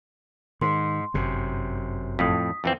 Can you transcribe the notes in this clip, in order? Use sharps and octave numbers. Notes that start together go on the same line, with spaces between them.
G#2 D#3 C6
G1 F#2 C3
F2 A2 D#6 B6
F2 E3 C4